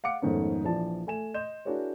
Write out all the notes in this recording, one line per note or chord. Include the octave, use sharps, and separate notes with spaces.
F5 F#5 D6 C#7
F2 G#2 D#3 A3 B3 C#4
A#1 E3 F3 D5 A5
A3 G#5 E7
D#5 C6 G6 E7
D4 E4 F#4 G#4 A#4 C#5